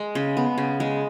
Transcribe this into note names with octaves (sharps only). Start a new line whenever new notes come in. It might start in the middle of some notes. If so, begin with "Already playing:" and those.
Already playing: G#3
C#3
B3
C#3
G#3